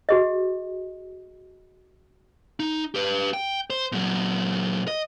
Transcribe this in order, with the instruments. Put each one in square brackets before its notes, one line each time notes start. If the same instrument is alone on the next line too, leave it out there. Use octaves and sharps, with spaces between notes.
[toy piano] F#4 G#4 D#5
[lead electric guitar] D#4
G4 B4
G5
C5
A#2 F#3
D#5